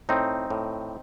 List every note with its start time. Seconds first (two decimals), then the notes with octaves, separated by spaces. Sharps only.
0.09 A2 C4 D#4
0.50 A2